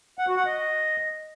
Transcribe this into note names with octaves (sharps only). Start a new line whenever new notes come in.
F#5
F#4
F#5
D#5